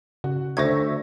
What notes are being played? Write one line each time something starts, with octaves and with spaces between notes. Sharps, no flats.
C#3 F#4
D2 C5 E5 C#6 G#6 A#6